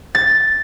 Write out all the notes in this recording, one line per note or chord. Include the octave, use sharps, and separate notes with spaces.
A6